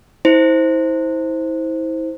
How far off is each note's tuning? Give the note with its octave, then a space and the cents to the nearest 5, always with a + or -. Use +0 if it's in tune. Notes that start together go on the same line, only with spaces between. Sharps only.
E4 -35 C5 +0